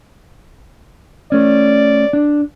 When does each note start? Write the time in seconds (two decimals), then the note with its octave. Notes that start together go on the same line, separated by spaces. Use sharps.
1.32 A3 C#4 D5
2.13 D4